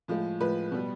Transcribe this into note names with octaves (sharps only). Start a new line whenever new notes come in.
A2 F3 G#3
A2 F3 G#3 B4
B2 G3